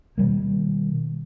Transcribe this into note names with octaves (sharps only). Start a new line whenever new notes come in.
B2 D#3 G3 A#3